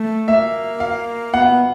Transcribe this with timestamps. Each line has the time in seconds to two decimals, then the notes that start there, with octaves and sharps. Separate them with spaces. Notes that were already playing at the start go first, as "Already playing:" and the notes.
Already playing: A3
0.28 A#3 E5
0.80 F5
1.34 B3 F#5